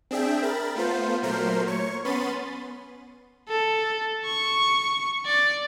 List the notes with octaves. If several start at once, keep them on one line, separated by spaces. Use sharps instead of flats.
C4 D4 G#4 E5 G5
A#4 B5 A6
A3 B3 F4 C5
A#2 F#3 A3 A#4 C5 C6
C#5 C#6
B3 C#4 B5 C6 A6 D#7
A4
C#6
D5